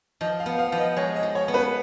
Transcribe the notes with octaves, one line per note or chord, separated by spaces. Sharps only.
F3 D#5
F5
B3
F5
F3
D#5
G#3 C#5
D#5
F3
C#5
B3
B4